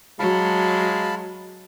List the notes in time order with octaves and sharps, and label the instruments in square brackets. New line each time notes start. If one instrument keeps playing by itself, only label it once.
[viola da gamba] F#3 [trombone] G#3 [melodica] F5 A5 B5